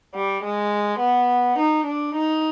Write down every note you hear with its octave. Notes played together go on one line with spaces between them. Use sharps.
G3
G#3
B3
D#4
D4
D#4